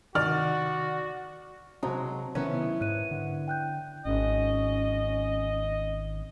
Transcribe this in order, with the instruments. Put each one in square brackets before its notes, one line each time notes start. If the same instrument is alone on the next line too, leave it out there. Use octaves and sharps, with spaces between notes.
[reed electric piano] C3 D#3 [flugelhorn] F#4 [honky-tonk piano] D5 [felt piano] F6
[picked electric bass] C3 C4 [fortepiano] F#3 A#5 [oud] G#3 [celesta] A5 D#6
[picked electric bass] C3 D#3 F#3 [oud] B3 E4 A#4 [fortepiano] C#4
[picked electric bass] G#2 [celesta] F#6 D#7
[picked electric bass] D3
[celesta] G5 F#6 G6
[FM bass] G#1 [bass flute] C#4 [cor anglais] D#5